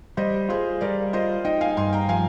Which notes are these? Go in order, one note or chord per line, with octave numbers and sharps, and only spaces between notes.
G3 C5 D#5
F4 G#4 C5
G3 A#4 D5
F4 C5 D#5
D#4 D#5 G5
F5 G#5
G2 G#5 C6
G5 A#5
F3 F5 G#5